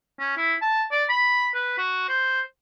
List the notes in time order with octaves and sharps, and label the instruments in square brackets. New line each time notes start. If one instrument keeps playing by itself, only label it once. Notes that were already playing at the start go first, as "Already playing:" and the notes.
[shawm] C#4
E4
A5
D5
B5
B4
F#4
C5